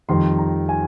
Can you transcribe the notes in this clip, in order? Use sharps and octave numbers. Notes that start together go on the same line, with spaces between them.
F2 D#3 G3 C6
A#5
G#5